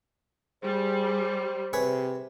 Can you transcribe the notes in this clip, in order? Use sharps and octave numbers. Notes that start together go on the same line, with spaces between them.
G3 G#4 C5
C3 G#4 B4 C#5